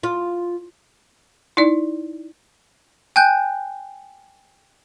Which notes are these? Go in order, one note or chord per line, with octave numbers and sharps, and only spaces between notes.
F4
D#4 E4 D5
G5 G#5 F#6 G6